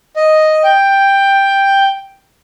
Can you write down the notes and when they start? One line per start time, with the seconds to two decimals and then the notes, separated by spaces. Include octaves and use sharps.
0.16 D#5
0.64 G5